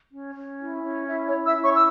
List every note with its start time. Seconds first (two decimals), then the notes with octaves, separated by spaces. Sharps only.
0.11 C#4
0.35 C#4
0.61 E4
0.84 C#4
1.09 E4 E5
1.28 C#5
1.34 C#4
1.46 E5 E6
1.58 E4
1.64 C#5 C#6
1.75 E6